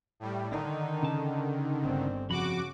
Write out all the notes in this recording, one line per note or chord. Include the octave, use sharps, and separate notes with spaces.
A2 G3
D3 D#3 D#4
C#3 A5
G1 C4
F2 C#3 F#4 B5 D6